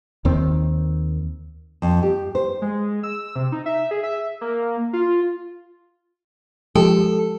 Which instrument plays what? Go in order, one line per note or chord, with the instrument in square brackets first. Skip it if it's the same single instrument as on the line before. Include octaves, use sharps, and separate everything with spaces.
[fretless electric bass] D#2 D#3 C4
[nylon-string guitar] F2
G4
C5
[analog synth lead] G#3
E6
C3
D#4
E5
G#4
E5
A#3
F4
[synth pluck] F3 G#3 G4 [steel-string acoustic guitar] A4